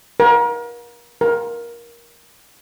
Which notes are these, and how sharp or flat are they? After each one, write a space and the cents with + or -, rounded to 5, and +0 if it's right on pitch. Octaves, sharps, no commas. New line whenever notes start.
A#4 +35
A#4 +15